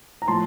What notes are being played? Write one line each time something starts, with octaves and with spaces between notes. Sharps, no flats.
A#5
A2 F3 A5 C6